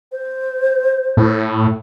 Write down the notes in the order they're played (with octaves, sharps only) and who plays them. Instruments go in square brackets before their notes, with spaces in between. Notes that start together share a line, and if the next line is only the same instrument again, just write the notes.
[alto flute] C5
[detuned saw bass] A2